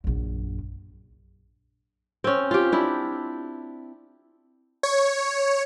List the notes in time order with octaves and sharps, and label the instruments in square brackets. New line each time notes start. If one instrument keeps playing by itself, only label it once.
[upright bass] A#1 F#2
[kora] C4 C#4
F4 G4
D4 E4
[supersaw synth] C#5